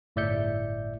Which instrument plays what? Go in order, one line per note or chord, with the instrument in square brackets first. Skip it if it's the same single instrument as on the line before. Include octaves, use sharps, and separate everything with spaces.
[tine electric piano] G1 A2 D5 E5 G6 C#7